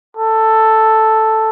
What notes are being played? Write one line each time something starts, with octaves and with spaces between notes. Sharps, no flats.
A4